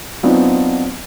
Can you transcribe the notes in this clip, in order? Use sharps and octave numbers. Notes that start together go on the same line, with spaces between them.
F#3 B3 C4 D4 D#4 F4